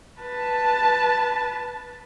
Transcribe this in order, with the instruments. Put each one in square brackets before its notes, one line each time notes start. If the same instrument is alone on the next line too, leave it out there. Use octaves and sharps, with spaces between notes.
[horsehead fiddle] B4 A5